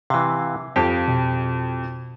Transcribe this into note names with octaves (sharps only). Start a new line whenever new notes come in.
C3 E3 F5
F2 G4 F5
B2